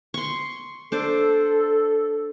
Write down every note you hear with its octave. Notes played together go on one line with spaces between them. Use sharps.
C6 C#6
D4 A4 C5 D5